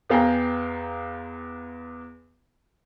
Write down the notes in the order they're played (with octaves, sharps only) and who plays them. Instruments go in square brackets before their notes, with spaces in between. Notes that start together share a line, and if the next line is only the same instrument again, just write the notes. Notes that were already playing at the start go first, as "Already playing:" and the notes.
[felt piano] E2 B3 F5 G5 G#5 A#5